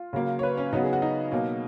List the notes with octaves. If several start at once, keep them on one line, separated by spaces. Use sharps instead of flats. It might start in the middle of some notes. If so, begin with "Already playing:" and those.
Already playing: F4
C#3 F#3 A#3
C#5
B4
C#4
C#3 F#3 B3 D#4
G#4
F#4
D#4
B2 F#3 A#3